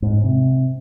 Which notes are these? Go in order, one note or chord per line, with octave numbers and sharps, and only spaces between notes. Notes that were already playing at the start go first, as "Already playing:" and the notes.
G#2
C3